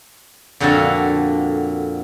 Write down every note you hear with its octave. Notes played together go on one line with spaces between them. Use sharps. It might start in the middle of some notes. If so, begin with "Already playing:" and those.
F2 A#2 D3 F#4 A4 F5